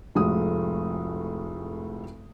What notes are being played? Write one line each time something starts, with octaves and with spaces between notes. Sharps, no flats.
F1 A2 F3 G#3 F#4 D#6